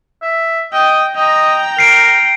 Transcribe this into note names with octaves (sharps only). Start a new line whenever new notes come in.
E5
D#5 G5
D#5 G5 A#5
A#4 C7 D7